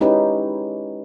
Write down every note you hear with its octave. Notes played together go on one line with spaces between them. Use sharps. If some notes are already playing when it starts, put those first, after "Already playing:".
G#3 C#4 D#4 E4 G4 B4